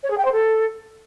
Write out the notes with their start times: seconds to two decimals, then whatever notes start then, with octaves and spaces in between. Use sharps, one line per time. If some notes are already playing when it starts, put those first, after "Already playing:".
0.03 C#5
0.10 G#4
0.17 G5
0.25 C5
0.32 A4